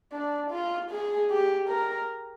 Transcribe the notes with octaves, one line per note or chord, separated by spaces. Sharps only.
D4
F4
G#4
G4
A#4